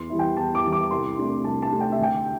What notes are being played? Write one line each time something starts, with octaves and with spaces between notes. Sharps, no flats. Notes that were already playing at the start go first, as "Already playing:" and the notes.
Already playing: E2 C6
E3 G3 E4
G5
E2 A5
D6
E3 G3 E4
D6
C2 C6
C3 A3 D4
C2 A5
A5
C3 A3 D4
G5
E5
D2 G5